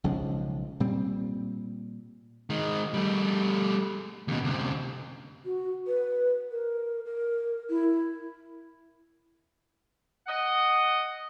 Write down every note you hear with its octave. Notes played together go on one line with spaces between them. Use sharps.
B1 C#3 F3 G#3
A#2 G3 C4
D#3 G#3
G3 A3
D#2 B2
D2 C3
F#4
B4
A#4
A#4
E4
D#5 F#5